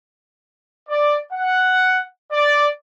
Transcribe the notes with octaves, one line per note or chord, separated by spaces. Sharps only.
D5
F#5
D5